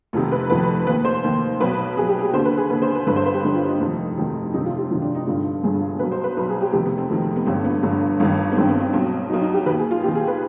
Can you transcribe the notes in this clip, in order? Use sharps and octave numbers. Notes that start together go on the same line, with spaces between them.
F1 F2 C3 D#3
B4
F1 F2 C3 D#3 B4
D#2 D#3 B4
C5
D#2 D#3
B1 B2 B4
B1 B2 G#4
G4
G#4
D#2 D3 C5
B4
G#4
D#2 D3 B4
C5
B4
G1 G2 D3 B4
C5
B4
G4
G1 G2 D3 D#4
F4
D#4
F1 F2 C3 D#3
F1 F2 C3 D#3
G1 F2 C3 D#3 D#4
F4
G4
G1 F2 C3 D#3 F4
D4
D#4
G1 G2 D3 F4
G1 G2 D3 G#4
B1 B2 B4
C5
B4
B1 B2 B4
G#4
G4
F1 F2 C3 D#3 G4
B3
C4
F1 F2 C3 D#3
B3
G1 G2 D3 C4
B3
G1 G2 D3
G1 G2 D#3
B3
G1 G2 D#3 C4
B3
C4
B1 B2 C4
B1 B2 D#4
D#4
G4
D#2 D#3 B4
G#4
F4
D#2 D#3 G4
G#4
B4